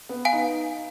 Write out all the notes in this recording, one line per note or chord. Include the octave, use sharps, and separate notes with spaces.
B3
F5 G#5
D#4